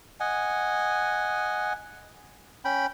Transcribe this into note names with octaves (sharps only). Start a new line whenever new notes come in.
D#5 F#5 G#5
C#4 G5 B5